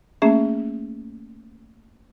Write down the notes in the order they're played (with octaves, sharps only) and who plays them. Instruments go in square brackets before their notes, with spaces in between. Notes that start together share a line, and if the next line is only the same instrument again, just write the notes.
[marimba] A3 A#3 C#4 G#4 E5